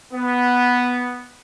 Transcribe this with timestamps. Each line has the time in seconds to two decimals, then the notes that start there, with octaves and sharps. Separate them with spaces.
0.14 B3